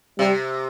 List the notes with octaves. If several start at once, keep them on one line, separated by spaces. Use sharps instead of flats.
C3 G3